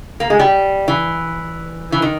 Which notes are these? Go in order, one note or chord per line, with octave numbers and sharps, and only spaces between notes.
A#3
G#3
G3
E3
E3
D#3